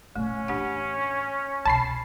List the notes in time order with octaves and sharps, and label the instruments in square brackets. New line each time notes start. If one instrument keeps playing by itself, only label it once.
[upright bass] A#2 D3 [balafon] A3 [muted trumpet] C#4
[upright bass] A2 E3 [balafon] D4 G4 F#5
[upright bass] C2 B2 [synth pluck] A5 B5 C7